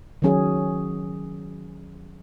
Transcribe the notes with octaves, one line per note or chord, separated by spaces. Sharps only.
D#3 F#3 C#4 G#4